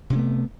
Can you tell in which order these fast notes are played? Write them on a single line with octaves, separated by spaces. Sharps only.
C3 C#4 A3 B3